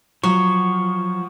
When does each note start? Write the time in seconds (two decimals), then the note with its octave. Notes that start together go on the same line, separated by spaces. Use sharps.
0.23 F3 F#3 C#6